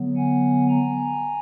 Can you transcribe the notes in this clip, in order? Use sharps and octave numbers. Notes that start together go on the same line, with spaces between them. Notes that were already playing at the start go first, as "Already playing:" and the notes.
Already playing: D3 F#3 B3
F#5 G#5
G#5 A#5